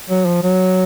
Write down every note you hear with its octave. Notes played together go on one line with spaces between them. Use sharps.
F#3
F3
F#3